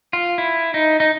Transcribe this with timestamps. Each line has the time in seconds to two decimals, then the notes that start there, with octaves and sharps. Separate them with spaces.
0.13 F4
0.38 E4
0.74 D#4
1.00 D#4